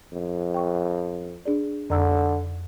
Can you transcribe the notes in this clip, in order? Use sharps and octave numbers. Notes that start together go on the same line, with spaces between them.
F2
G5 C#6
D4 G#4 D5
F2 D3 A#5 E6